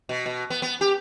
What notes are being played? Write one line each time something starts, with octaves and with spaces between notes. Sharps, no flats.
B2
B2
B3
B3
G4